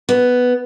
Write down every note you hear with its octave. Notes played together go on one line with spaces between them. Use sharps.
B3